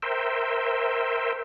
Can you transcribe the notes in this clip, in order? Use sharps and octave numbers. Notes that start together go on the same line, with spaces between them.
A#4 C5 E5 G5